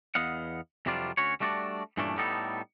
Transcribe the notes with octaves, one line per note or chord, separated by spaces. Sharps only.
E2 B3 D#5 F5 F#5
F2 C3 F#3 G3 D4 F4
D2 C#4 F#4 C#5
G3 A3 D4 F#4 C#5 D5
G2 A#2 E3 A3 C#4 D4
A2 G3 B3 D#4 A4